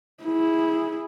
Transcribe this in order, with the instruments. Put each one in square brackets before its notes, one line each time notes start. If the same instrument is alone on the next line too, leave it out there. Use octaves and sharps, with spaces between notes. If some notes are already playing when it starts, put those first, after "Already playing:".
[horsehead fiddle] E4 G#4